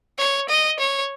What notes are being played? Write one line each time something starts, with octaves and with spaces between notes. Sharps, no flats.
C#5
D#5
C#5